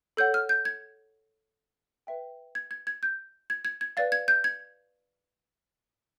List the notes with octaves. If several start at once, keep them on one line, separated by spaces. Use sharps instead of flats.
A4 C#5 F#5 G6
F6
G6
G#6
B4 E5 G5
G#6
G#6
G#6
G6
G#6
G#6
G#6
B4 D5 F5 A6
G#6
G6
G#6